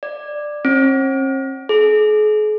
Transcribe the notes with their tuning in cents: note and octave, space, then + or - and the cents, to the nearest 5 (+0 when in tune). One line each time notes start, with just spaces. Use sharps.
D5 +10
C4 +45
G#4 +40